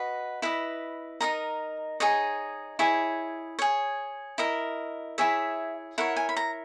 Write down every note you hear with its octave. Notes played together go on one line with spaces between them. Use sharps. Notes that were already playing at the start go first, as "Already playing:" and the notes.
Already playing: F#4 B4 D#5
E4 B4 D#5
D#4 A#4 D#5 A#5
D#4 G#4 C#5 D#5
E4 G#4 C#5
G#4 C#5
E4 A#4 D#5
E4 G#4 C#5 E5
E4 A#4 C#5 F#5
G#5
B5
A#5